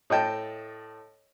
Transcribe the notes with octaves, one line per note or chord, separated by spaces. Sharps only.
A2 D#5 G5 A5